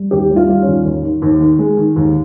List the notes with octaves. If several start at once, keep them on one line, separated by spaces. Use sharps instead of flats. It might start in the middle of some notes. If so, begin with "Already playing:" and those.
Already playing: G3
D#2 G4
G3
F4
G3
C#4
D#2
D#2
D#3
D#2
D#3
G#3
D#3
D#2